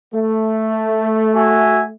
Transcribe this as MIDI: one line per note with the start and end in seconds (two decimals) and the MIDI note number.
0.14 1.95 57
1.35 1.81 66
1.35 1.81 76
1.35 1.81 80